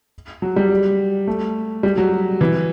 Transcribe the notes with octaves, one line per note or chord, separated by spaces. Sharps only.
F#3
G3
A3
G3
F#3
E3